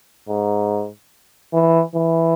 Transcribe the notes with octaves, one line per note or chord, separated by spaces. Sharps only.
G#2
E3
E3